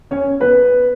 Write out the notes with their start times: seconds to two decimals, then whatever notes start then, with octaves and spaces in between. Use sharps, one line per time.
0.11 C#4 C#5
0.40 B3 B4